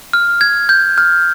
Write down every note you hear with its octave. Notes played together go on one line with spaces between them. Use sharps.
F6
G#6
G6
F6